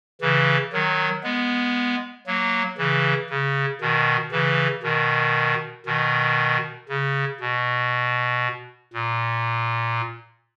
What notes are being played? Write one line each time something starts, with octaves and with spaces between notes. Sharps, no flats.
C#3 E3
D#3 F#3
G#3 B3
F#3 A#3
C#3 E3
C#3
B2 D#3
C#3 E3
B2 D#3
B2 D#3
C#3
B2
A#2